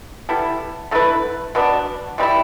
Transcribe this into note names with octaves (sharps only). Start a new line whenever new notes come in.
G3 B3 E4 A4
D3 A3 E4 B4
B2 B3 D4
B2 G3 C4 E4